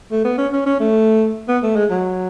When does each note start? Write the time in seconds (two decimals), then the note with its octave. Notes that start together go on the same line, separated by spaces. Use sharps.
0.11 A3
0.24 B3
0.38 C#4
0.53 C#4
0.66 C#4
0.80 A3
1.48 B3
1.63 A3
1.76 G#3
1.90 F#3